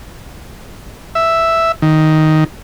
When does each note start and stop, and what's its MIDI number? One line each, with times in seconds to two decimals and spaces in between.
1.15 1.72 76
1.82 2.44 51